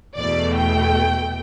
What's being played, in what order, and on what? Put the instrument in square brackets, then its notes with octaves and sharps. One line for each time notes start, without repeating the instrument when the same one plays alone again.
[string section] E2 B2 A3 D5
G5